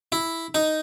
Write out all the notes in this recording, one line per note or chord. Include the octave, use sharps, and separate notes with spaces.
E4
D#4